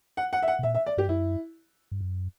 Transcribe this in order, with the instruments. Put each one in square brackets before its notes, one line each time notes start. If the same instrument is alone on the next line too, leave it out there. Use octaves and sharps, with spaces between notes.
[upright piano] F#5
F#5
E5
F#5
[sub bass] B2
[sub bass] A#2 [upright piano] E5
[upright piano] E5
D5
[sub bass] G2 [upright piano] G4
[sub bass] F#2 [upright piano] E4
[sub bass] G2
F#2